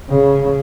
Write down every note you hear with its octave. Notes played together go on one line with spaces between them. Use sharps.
C#3